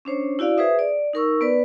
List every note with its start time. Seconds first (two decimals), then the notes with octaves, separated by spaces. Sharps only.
0.05 C#4 D4 C5 C#5
0.39 E4 F#4 D5 F5
0.57 G#4 B4 C5 E5 D#6
0.79 D5
1.13 D#4 A#4 C#6 E6
1.41 B3 B4 D5